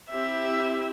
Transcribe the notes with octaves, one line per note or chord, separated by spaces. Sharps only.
C4 E4 G4 E5